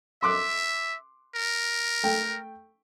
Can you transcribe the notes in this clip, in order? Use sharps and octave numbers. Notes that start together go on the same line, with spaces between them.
E5 C6 D6 F#6
A#4
A3 G5